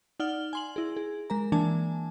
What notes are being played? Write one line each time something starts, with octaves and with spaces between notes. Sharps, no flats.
D#4 D5 F#5 F6 G7
G#5 C6 F#7
E4 G#4
G#4
G#3 A#4 A#5
E3 A#3 D4 G#5 A5